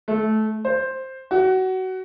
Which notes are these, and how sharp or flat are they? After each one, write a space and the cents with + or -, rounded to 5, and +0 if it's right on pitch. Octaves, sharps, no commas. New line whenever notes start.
A3 -20
C5 +5
F#4 +20